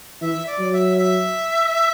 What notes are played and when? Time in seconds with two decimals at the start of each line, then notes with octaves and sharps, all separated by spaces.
0.21 E3 E5
0.46 D5
0.59 F#3
0.72 E5
0.97 E5